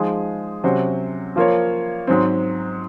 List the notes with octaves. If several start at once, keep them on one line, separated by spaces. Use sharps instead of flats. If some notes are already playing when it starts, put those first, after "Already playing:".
Already playing: F3 G#3 D#4 G#4
C3 F#3 C#4 F#4 C5
F3 A#3 F4 A#4 C#5
G#2 F#3 C4